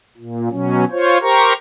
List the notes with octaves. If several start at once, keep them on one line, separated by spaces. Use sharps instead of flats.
A#2
B2 F#3 C#4
F4 C5 C#5
G4 A#4 C5 A#5 C#6